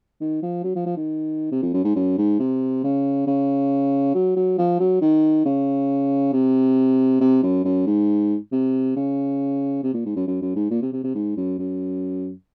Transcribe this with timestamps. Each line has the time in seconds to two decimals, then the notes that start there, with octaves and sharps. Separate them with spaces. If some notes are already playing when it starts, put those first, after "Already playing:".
0.21 D#3
0.42 F3
0.64 F#3
0.76 F3
0.86 F3
0.97 D#3
1.52 C3
1.62 F2
1.74 F#2
1.84 G#2
1.95 F#2
2.18 G#2
2.39 C3
2.83 C#3
3.27 C#3
4.14 F#3
4.36 F#3
4.58 F3
4.79 F#3
5.02 D#3
5.45 C#3
6.33 C3
7.21 C3
7.43 F#2
7.64 F#2
7.87 G#2
8.52 C3
8.96 C#3
9.83 C3
9.94 A#2
10.05 G#2
10.16 F#2
10.27 F#2
10.41 F#2
10.56 G#2
10.70 A#2
10.82 C3
10.93 C3
11.04 C3
11.15 G#2
11.37 F#2
11.58 F#2